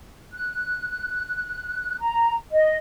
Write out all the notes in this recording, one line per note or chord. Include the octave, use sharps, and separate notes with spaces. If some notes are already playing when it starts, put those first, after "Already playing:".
F#6
A#5
D#5